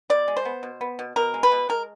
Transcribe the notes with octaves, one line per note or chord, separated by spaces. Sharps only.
B2 D5
G#3
C5
B3
B2
B3
B2
B2 A#4
G#3
B4
B2
G#3 A#4